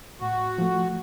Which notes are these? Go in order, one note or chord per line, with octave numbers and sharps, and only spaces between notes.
A2 F#4
F3 A3